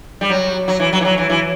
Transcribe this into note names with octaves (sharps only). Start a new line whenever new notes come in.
G3
F#3
F#3
E3
F#3
E3
F#3
E3
E3